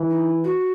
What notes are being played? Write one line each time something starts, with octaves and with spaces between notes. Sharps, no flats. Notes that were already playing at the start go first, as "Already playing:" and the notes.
Already playing: E3
D#4
F#4